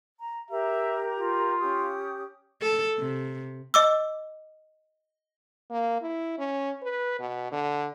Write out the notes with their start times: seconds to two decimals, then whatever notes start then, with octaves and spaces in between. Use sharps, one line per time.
0.20 A#5
0.51 G4 A#4 E5 A#5
1.18 F4
1.60 C#4 G4 D#6
2.61 A4
2.99 C3
3.74 D#5 D6 E6
5.70 A#3
6.02 E4
6.38 C#4
6.83 B4
7.20 B2
7.52 D3